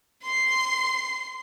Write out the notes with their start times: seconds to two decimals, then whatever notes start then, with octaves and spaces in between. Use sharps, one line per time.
0.23 C6 C7